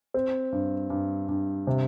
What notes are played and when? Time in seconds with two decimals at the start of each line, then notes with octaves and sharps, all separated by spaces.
0.14 C4
0.52 G2
0.90 G2
1.29 G2
1.67 C3